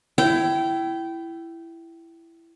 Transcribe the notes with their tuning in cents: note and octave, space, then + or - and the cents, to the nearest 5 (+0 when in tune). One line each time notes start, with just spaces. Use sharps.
E4 +15 G5 -20